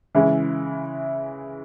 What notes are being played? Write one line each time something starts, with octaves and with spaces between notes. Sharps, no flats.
C#3 E3 G#3 C#4 E4